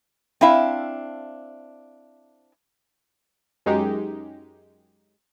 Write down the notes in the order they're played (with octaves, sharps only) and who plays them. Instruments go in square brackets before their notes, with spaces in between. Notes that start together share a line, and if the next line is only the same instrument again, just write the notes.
[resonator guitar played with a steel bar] C4 D4 E4 E5 F5
[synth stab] F#2 G#3 D#4 G4